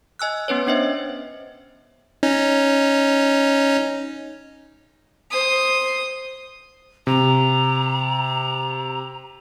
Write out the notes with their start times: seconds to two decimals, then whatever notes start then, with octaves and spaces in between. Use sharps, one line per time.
0.19 D#5 G#5 E6 F#6
0.48 B3 C#4 B4 C#5
0.67 C#4 D4 C5 D#5 E5
2.23 C#4 D#4
5.31 C5 D#6
7.07 C3 A#5